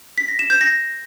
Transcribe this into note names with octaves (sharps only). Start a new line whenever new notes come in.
B6
A#6
E7
G6
A#6